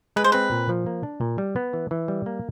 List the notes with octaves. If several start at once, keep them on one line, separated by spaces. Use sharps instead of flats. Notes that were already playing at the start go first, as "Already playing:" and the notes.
G#3 B4
C5
C4 B4
A#2
F3
A#3
D4
A#2
G3
B3
E3
E3
G3
A#3